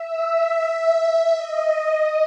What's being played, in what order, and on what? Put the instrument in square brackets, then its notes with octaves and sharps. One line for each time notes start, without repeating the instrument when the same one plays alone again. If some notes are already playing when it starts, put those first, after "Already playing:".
Already playing: [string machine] E5
E5
D#5